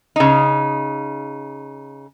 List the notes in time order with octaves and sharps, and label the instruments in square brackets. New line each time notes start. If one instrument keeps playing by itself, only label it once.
[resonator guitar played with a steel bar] C#3 D#4